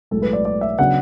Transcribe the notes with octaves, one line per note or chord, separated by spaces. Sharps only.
B1 A2 G#3 A4
B4
D5
D5
E5
C#3 F#3 B3 D4 F#5